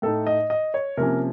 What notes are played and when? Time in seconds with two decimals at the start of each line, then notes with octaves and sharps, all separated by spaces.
0.02 A2 A3 D#4 A4
0.27 D#5
0.50 D#5
0.74 C#5
0.97 C3 F3 A#3 C#4 A#4